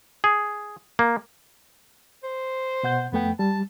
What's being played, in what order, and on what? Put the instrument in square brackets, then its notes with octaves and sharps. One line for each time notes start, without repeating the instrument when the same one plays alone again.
[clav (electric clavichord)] G#4
A#3
[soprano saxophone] C5
[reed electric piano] B2 F#5 G6
[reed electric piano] F2 A3 G5 [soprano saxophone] B3
[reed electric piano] G3 [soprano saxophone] A5